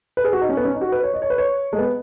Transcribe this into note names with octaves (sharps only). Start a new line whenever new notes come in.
B4
G#4
F#4
D#4
C#4
B3
C#4
D#4
F#4
B4
C#5
D#5
C#5
B4
C#5
G#3
B3